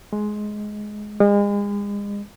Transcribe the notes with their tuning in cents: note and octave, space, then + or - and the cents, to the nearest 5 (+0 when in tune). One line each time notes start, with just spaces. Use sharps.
G#3 +15
G#3 -35